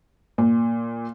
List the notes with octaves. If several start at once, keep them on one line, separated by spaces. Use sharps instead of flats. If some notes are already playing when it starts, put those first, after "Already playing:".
A#2